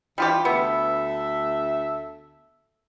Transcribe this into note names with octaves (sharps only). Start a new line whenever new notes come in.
E3 G3 F4 G4
D2 B3 A4 E5